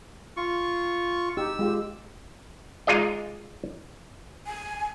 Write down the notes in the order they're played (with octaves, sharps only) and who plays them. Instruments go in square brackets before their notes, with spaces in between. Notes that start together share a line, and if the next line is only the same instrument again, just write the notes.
[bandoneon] F4 C#6
[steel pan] D#4 G4 [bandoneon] E6
[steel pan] G#3 F4 G4
[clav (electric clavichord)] G#3 D#4 F4 G#4 D5 D#5
[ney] G#5